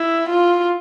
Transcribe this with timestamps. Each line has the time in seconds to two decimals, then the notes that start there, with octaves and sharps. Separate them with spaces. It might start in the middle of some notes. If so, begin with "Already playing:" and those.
Already playing: E4
0.30 F4